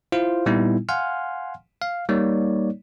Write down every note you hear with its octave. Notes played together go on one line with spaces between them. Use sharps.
E4 F4 C5 F5
A#2 G3 B3 D#4 E4
F5 F#5 G#5 C6 F6
F5
G3 A#3 D#4 C#5 D5